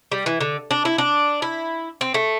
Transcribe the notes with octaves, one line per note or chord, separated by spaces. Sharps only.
G3
E3
D3
D4
E4
D4
E4
C4
A3